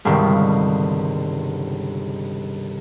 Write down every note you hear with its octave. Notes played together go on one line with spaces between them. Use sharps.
G1 C#2 G2 C3 D#3